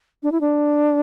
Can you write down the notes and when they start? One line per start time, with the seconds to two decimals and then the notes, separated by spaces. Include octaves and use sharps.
0.23 D4
0.32 E4
0.41 D4